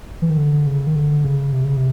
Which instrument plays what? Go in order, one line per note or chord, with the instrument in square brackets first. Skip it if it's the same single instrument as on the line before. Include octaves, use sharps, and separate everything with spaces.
[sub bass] E3
D#3
D3
C#3
D#3
D3
C#3
C3
C#3
C3